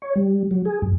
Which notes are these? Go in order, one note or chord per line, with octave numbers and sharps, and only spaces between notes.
C#5
G3
F#3
G#4
F#2